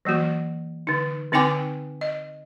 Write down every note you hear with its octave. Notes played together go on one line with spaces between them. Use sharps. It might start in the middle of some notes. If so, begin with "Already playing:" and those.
E3 F#3 A#3 F#4
D3 D#4
D3 C4 D#4 G5 G#5 D6
D#5